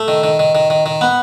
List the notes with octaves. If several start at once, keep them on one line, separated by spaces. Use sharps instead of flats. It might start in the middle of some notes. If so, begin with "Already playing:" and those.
Already playing: A3
D#3
D#3
D#3
D#3
D#3
D#3
B3